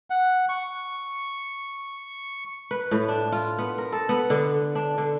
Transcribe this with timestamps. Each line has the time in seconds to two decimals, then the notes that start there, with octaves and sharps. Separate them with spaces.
0.10 F#5
0.49 C#6
2.71 B4
2.91 A2
3.08 D4
3.32 F4
3.59 B3
3.78 A#4
3.93 A4
4.09 B3
4.30 D3
4.75 D4
4.98 D3